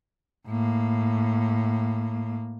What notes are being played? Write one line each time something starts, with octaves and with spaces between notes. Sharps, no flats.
A2 A#3